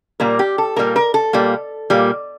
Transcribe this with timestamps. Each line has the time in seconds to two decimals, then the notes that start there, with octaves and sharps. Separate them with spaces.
0.20 A#2 G3 A#3 A#4
0.39 G4
0.58 A4
0.76 A#2 G3 A#3 A#4
0.96 A#4
1.14 A4
1.33 A#2 G3 A#3
1.90 A#2 G3 A#3